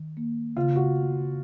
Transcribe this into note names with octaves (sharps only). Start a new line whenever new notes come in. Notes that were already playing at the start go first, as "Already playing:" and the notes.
Already playing: D#3
A#3
C#3 F4
F#4